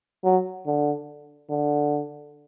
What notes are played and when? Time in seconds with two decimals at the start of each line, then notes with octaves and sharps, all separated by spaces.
0.24 F#3
0.66 D3
1.49 D3